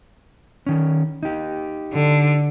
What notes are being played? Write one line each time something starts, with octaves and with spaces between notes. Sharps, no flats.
D#3 C#4
D#4 G4
D3